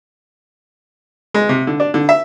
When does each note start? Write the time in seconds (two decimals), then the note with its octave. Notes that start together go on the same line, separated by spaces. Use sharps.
1.34 G#3
1.49 C3
1.67 D3
1.80 D4
1.94 D3
2.09 E5